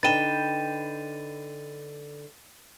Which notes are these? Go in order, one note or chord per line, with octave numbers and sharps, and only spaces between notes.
D3 D#4 B4 G5 A6 D#7 E7